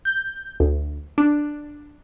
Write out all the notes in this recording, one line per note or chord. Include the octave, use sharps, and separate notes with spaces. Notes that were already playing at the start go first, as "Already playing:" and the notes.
G6
D2
D4